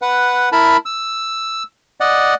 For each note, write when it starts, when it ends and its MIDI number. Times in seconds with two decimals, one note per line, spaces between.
0.02 0.49 71
0.02 0.49 78
0.52 0.77 64
0.52 0.77 70
0.52 0.77 81
0.52 0.77 83
0.86 1.63 88
2.00 2.34 74
2.00 2.34 75
2.00 2.34 78